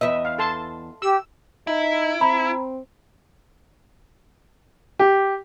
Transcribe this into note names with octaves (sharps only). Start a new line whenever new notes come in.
E2 B4 D#5 E5
F5
A4 A5 C6
G4 E6
D#4 E4
C4 A#5 B5
G4